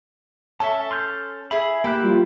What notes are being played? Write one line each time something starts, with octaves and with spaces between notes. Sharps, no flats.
C#4 A4 E5 A5
C6 F6 G6
E4 G#4 B5
A#3 E4 G4 G5 B5 F#6
F3 G3 F4